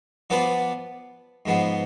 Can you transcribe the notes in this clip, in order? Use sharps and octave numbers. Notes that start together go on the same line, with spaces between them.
F3 B3 F4 B4 D5
G#2 F3 B3